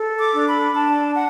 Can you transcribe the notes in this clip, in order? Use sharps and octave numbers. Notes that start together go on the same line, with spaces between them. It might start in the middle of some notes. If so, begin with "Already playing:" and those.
Already playing: A4
D6
D4
B5
D4 A5
F#5